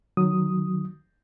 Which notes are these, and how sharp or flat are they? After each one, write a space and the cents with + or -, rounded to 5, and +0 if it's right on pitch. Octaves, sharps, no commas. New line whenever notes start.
D#3 -20 F#3 +0 D#6 +0